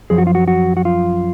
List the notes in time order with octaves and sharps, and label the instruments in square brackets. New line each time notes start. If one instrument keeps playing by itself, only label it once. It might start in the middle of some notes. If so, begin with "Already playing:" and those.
[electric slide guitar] F#2 F3 G#4
F#4
F4
F#4
F#4
F#4
F4